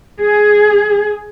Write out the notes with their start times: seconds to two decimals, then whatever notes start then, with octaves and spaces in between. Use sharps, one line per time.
0.21 G#4